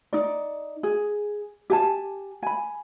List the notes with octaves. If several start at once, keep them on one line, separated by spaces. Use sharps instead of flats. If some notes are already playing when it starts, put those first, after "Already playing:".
D#4 D5
G#4
G4 G#5 A5
G#5 B5